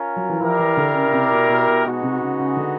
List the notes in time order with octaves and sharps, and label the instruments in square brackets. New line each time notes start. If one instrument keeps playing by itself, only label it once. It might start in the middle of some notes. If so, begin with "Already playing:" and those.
Already playing: [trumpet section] C#4 F4 A#4
[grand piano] F#3
E3
[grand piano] F3 [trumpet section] E4 G4 A#4 D5 F5
[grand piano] E3
D3
C#3
C#3
C3
B2
B2
B2
[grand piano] B2 [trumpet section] G#3 B3 D#4 F#4
[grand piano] C3
C#3
C#3
D3